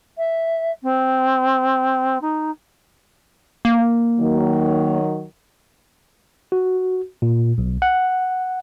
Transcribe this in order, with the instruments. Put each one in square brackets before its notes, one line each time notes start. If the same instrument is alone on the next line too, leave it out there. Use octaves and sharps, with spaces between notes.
[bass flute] E5
C4
D#4
[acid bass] A#3
[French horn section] D#3 F#3
[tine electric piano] F#4
A#2
B1
F#5